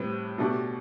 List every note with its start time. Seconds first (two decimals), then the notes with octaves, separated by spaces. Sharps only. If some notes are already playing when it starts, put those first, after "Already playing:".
Already playing: A2 G3 C4 G4 B4
0.38 B2 A3 D4 G4